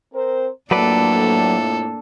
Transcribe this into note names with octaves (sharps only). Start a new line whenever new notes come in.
C4 A#4 C5
F2 A2 F#3 A#3 D4 A4 B4 D5